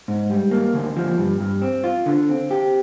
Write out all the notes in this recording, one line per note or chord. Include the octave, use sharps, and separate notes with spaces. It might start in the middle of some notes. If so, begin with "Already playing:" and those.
G#2
G3
A#3
D2
F3
G2
G2
C4
F4
D3
C4
G4